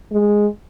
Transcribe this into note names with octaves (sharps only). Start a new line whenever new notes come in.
G#3